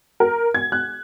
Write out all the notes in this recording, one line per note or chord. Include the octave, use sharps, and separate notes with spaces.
A#4
G#6
F#6